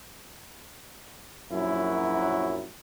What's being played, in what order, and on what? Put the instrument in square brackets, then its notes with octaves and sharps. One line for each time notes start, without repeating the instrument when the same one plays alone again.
[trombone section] A#1 F#2 F#3 E4